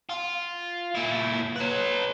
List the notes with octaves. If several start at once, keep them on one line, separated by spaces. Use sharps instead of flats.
F4
A#2 E4
B4 C#5